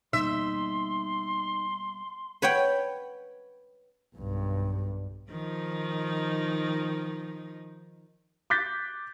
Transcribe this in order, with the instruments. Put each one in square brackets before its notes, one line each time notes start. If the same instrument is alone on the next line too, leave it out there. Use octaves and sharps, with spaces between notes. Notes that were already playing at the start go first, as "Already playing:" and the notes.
[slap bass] B2 G3 A#3 [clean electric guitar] D#4 [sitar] E5 [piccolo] C6
[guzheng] B4 C#5 F#5 G5
[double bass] B1 G2
[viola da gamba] D#3 F3 D#4
[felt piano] D6 F#6 G6 A6 B6